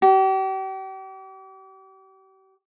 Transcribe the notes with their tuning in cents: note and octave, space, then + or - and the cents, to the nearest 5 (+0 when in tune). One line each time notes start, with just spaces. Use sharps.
G4 -40